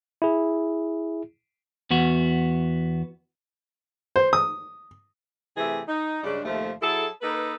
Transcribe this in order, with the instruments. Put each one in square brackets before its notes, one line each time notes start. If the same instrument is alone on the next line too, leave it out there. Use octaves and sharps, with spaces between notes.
[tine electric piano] E4 G#4
[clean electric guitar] E2 B3 F#4
[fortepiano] C5
D#6
[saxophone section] C3 E3 A3 G4 G#4
D#4
G2 C#3 G#3 D4
D#2 C3 F3 A3
F#3 E4 G#4 A4
A#3 D#4 A4 B4